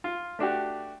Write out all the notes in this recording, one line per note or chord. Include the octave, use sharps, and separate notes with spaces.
F4
A3 D4 F#4 G4